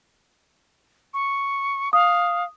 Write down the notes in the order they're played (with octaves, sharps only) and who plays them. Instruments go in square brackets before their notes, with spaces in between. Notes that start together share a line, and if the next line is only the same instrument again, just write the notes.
[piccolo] C#6
[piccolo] F5 [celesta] D#6